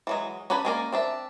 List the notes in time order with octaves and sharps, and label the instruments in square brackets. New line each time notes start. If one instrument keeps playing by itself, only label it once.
[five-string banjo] E3 F#3 G#3
C#4 D4 B4 G#5 B5
G#3 A#3 C#4 A#4 D5
C4 D4 E5